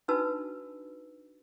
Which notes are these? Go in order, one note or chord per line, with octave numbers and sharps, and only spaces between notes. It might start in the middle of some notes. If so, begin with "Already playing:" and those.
D4 D#4 F#4 B4 A5 E6